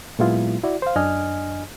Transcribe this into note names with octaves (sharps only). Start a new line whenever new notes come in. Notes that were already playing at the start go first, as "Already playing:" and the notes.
A#2 F#3 G#3 B3 E4 F4
E4 F#4 D5
C5 F5
F#2 D4 D#5 G#5 F6